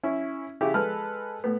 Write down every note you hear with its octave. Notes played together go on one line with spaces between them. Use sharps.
C#4 E4
C#3 E4 G4
G#3 A4 B4 F6
A2 B3